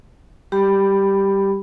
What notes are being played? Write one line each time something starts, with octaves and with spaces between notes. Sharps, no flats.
G3 G4 B5